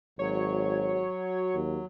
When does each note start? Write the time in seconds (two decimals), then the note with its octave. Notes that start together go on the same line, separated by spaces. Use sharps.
0.19 G#1 F#3 C#5
0.93 F#4
1.55 D#2